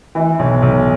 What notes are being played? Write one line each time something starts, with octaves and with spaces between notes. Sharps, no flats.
E3
B1
B1